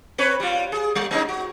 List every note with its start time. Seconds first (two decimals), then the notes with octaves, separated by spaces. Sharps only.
0.18 C4 B4 C#5
0.40 G3 F4
0.72 G#4
0.95 G3
1.11 A3 C#4 D#4
1.29 F#4